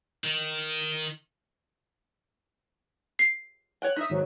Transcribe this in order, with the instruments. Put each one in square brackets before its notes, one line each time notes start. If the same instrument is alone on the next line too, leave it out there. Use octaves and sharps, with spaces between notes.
[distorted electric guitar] D#3
[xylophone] C7
[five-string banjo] C#5 F#5 G5 [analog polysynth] F#6
[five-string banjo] D#4 E5 [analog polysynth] D#6 E6 B6
[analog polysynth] G#2 D#3 F#3